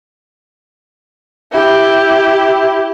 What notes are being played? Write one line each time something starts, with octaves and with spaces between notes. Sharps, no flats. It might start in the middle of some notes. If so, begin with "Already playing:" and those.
E4 G4